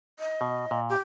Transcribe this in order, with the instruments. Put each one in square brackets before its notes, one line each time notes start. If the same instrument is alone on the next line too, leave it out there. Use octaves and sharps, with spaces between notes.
[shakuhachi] D#5
[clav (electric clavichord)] B2
A#2
[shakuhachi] G4